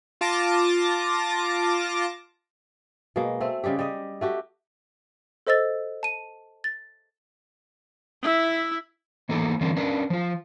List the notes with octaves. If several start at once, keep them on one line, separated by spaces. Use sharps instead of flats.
F4 A5 D6 A#6
B2 G#3 A#3
A3 C4
C#3 G3 G#3 G4
G3 D#5
A3 F#4 G4
A4 C5 D#5 E6 A6
A5 D#7
A6
E4 E5
E3 A#3 B3 D#4 A4
D3 E3 G3 A#3 C4
C#4 D4 A#4 B4
F3 F4